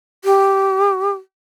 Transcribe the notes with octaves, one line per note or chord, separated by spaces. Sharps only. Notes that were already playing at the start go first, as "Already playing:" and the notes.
G4